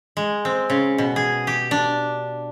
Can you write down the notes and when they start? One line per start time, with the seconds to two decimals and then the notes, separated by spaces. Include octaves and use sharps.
0.17 G#3
0.45 C4
0.70 C#3
0.98 B2
1.16 G#4
1.47 G4
1.71 D4